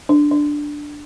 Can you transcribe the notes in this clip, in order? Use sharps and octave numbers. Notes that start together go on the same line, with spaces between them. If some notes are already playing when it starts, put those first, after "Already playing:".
D4
D4